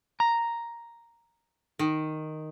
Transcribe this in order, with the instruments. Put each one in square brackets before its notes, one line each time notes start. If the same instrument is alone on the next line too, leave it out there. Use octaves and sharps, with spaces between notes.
[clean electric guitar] A#5
[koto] D#3